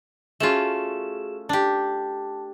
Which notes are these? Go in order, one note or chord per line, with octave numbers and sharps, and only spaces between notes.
A3 C#4 F4 F#4 G#4 E7
D4 G4 A5